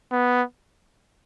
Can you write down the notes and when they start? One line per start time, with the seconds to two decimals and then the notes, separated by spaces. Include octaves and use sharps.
0.12 B3